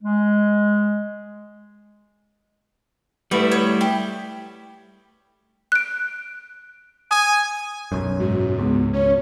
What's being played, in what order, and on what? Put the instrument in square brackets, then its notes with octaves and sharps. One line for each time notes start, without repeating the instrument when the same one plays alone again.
[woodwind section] G#3
[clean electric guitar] G3 A3 E4 [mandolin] B3 F#4 B4
[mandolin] C#5 D#5
G4
[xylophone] F#6 D7
[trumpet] G#5 [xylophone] D#6
[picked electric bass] B1 F#2
[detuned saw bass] G#2 [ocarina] F#4
[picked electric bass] C#2 [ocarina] B3
[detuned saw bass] C#4 [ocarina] C#5